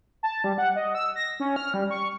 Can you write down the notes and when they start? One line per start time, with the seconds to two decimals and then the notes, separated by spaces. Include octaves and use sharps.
0.23 A5
0.44 G3
0.58 F#5
0.76 D#5
0.95 E6
1.16 A#6
1.40 C#4
1.56 F6
1.74 G3
1.90 C#6